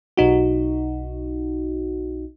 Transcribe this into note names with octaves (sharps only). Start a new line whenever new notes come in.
B1 D#4 F#4